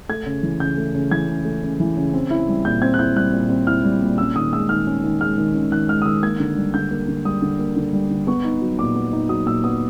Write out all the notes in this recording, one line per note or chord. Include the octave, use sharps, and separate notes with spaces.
A3 G#6
C#3
E3
C#3 G6
A3
C#3
E3 G#6
C#3
A3
C#3
E3
C#3
C4
E4
G3
A#2 G6
C4 G#6
F#6
E4 G6
G3 F#6
A#2
C4
E4 F6
G3
A#2
C#4 E6
D#3 D#6
G#3 E6
D#3 F6
C#4
D#3
G#3 F6
D#3
C#4
D#3 F#6
G#3 F6
D#6
D#3 E6
A#3 G#6
D3
G3
D3 G6
A#3
D3
G3 D#6
D3
A#3
D3
G3
D3
B3 C#6
D#4
F#3
A#2 D6
B3
D#4
F#3 D#6
A#2 E6
B3 D#6